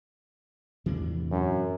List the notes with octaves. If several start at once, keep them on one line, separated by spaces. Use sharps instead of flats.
E2 A2 C3 E3 D4
F#2